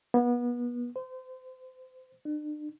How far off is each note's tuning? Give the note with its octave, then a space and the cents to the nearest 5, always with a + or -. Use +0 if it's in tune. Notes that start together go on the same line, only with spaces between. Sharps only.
B3 -30
C5 -30
D4 +40